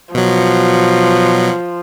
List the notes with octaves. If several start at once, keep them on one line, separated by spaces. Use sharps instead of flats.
B2 F3 F#3